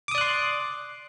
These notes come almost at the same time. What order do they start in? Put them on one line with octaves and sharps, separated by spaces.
D6 D#6 D5 F#6 C6